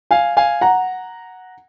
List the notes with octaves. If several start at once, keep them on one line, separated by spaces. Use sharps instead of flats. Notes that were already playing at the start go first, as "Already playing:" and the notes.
F5 G#5
F5 G#5
F#5 A#5